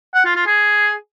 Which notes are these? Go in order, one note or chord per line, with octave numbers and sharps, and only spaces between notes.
F#5
F4
F4
G#4